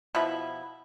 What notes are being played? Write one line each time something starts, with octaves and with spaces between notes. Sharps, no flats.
B2 F3 E4 B5